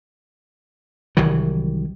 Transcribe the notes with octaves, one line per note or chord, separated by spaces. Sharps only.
C2 D#3 E3 F#3